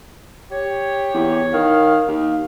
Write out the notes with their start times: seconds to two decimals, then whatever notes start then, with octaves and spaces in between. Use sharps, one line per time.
0.52 G4 C#5
1.14 E2
1.53 D#3 F5
2.08 D#2 F5